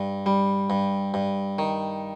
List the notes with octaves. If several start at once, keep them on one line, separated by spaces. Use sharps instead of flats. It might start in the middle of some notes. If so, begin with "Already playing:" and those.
Already playing: G2
G3
G2
G2
D#3